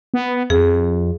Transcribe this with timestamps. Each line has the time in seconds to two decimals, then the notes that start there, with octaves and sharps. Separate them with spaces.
0.14 B3
0.50 F2 G#4